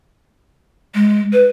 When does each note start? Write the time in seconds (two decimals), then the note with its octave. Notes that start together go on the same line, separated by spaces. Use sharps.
0.95 G#3
1.33 B4